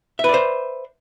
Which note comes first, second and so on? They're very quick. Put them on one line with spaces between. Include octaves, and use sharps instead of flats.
E5 B4 D5 C5